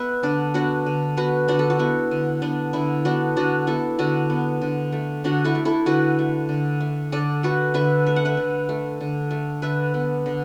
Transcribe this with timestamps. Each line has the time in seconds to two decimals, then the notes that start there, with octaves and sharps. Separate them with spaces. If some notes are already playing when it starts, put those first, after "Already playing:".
Already playing: B3 B4 E5 F#5
0.23 D3 D4
0.54 B3 D4 F#4
0.86 D3
1.17 B3 F#4 B4
1.48 D3 D4 F#4
1.59 A4
1.70 F#4
1.79 B3 E4
2.11 D3
2.42 B3 D4
2.73 D3 E4
3.05 B3 D4 F#4
3.36 D3 D4 F#4
3.67 B3 E4 A4
3.99 D3 D4 F#4
4.30 B3
4.61 D3
4.92 A3
5.24 D3 D4 F#4
5.44 E4 A4
5.55 A3
5.65 E4 A4
5.86 D3 F#4 B4
6.19 A3
6.49 D3
6.80 A3
7.12 D3 A4 D5
7.43 A3 F#4 B4
7.74 D3 B4 E5
8.06 A3 E5
8.16 F#5
8.25 B4 E5
8.37 D3
8.69 A3
9.01 D3
9.31 A3
9.62 D3 B4 E5
9.94 B3
10.26 D3